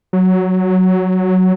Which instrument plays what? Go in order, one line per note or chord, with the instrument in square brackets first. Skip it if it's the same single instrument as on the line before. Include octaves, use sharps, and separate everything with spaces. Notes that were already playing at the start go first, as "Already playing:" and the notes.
[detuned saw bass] F#3